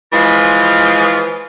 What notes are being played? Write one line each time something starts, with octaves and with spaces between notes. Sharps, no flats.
E3 F3 G#3 F4